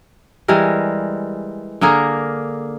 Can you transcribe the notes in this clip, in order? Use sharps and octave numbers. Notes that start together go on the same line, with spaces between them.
E3 G3 G#3 A#4
D3 A#3 G#4 A#4